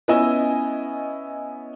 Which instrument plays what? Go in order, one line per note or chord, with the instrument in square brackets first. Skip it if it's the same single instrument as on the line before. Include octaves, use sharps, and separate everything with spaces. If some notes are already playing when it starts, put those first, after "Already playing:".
[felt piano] B3 C#4 E4 D#5 G#5 E6